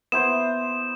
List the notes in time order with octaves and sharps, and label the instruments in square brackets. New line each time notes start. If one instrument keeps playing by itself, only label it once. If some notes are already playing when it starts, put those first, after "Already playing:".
[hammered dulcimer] B3 E4 C5 [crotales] E7